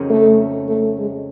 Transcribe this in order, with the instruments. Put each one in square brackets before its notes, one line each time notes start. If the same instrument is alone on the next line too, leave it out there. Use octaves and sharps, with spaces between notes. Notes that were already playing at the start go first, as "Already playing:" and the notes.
Already playing: [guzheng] F2 C#3 F#3 A#3 D#4
[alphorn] A3
A3
G#3